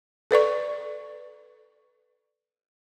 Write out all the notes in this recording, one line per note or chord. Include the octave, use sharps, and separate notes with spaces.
A4 B4 D5 C#6